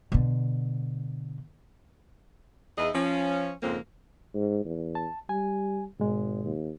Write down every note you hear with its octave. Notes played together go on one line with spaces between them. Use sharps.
B2 D3
E2 D#4 E4 G#4 D#5
F3 C#4
F2 G#2 C#3 A#3 C4
G#2
E2
A5
G3 G#5
G#1 G#2 B2 G#3
D#2